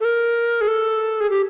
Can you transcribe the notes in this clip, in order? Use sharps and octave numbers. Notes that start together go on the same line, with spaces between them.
A4
A#4
G#4
A4
G#4
G4